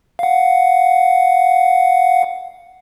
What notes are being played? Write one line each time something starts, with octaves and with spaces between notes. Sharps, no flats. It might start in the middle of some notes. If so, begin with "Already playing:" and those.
F5 F#5